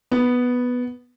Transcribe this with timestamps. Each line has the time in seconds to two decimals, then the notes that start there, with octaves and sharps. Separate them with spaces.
0.12 B3